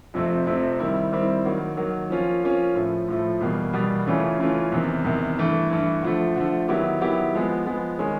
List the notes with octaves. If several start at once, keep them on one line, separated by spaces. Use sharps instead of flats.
F2 C3 F3 A3 C4
F2 C3 F3 A3 C4
D#3 G3 C4 E4
D#3 G3 C4 E4
D#3 F#3 A#3
D#3 F#3 A#3
F3 A#3 C#4 F4
F3 A#3 C#4 F4
A2 F3 A3
A2 F3 A3
E2 B2 G3 A#3
E2 B2 G3 A#3
C#3 E3 A3 C#4 F4
C#3 E3 A3 C#4 F4
E2 C3 D#3
E2 C3 D#3
G2 E3 A3
G2 E3 A3
D3 F3 A3
D3 F3 A3
D#3 F#3 B3 E4 G4
D#3 F#3 B3 E4 G4
F3 G#3 B3
F3 G#3 B3
D#3 G#3 C#4